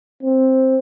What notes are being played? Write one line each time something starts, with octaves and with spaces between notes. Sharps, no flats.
C4